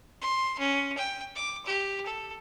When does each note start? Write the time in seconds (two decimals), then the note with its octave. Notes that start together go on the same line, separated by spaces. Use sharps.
0.22 C6
0.59 C#4
0.98 G5
1.35 D6
1.66 G4
2.06 A4